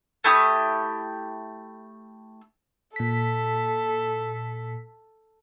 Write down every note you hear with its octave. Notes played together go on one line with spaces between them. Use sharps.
A3 E4 G4 D#6
A#2 A4 B6